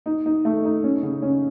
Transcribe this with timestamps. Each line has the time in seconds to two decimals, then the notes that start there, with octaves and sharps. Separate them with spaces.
0.06 D#4
0.26 D#4
0.45 A3
0.65 D#4
0.84 C#4
1.03 C#3
1.22 C#4